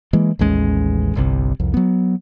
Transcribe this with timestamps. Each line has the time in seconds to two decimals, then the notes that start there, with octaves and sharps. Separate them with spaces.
0.13 E3 G#3 A#3
0.39 A1 D#2 G#3 C#4
1.15 G1 C2 C3
1.60 C2 F2
1.74 F#3 B3